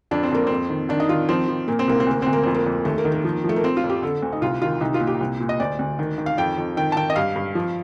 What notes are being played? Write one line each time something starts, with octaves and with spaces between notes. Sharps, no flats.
F2 D4
C4
F2 A#3
F2 C4
D#3
D#3 D4
D#4
D#3 F4
F3 C4
F3
A#2 A#3
C4
C2 A#3
C4
D2 A#3
D2 C4
A#3
F2 C4
A#3
F2
D#2 A3
A#3
D#3
A#3
F3
F3
A3
A#3
F3 C4
F4
F2
G4
D3 A4
D2
D#4
C2 F4
D#3 F4
C2 D#4
F4
A#2
G4
C2
A#2
D#5
D2 D5
D2
D#3
D#3
F5
F2 G5
F2
D#3 G5
A5
D#3 G5
D#5
G2 F5
G2
F3